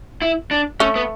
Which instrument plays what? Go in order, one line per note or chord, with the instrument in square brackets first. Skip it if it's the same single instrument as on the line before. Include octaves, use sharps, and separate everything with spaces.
[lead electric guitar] E4
D4
[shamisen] A3 [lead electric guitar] C#4
[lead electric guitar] B3